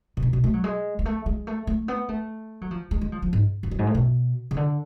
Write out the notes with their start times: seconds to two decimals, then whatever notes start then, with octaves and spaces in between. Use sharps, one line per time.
0.17 A2
0.23 B2
0.33 B2
0.44 A3
0.54 F#3
0.64 G#3
0.99 G#3
1.05 A3
1.26 G#3
1.47 A3
1.67 A3
1.88 B3
2.09 A3
2.61 F#3
2.71 F3
2.91 G#3
3.01 G#3
3.12 F3
3.22 F3
3.33 G#2
3.63 F2
3.71 F#2
3.79 G#2
3.87 A2
3.94 B2
4.51 C#3
4.56 D3